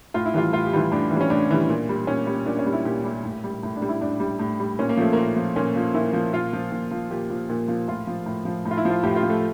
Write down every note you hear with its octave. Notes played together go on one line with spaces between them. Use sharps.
A2 F4
E4
E3 G3 F4
A2 F4
G4
E3 G3 F4
A2 D4
E3
G3 C#4
A2 D4
E3 G3
A#2
G3
A#2 C#4
G3
A#2 D4
C#4
G3
E4
A#2 G4
G3
A2
G3
A2
D4
G3
E4
A2 D4
G3
A2
G3
A#2 C#4
A#3
F3 A3
A#2 A#3
F3
A#2 C#4
F3
A#2 E4
F3
A#2 F4
F3
A#2
F3
A#2 G4
F3
A#2
F3
A2 F4
F3
A2
F3
A2
F4
E4
F3
F4
A2 G4
F4
F3
A3